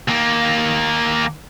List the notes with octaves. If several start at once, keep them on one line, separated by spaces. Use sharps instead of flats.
D#2 A#3